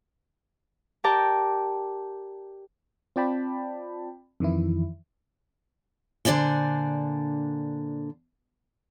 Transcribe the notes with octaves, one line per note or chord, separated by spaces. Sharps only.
G4 A#4 D5 G5 A5 A#5
C4 F4 D5 G5 A5 B5
F2 D#3 E3 E4
A#2 D3 D4 C5 D5 G#5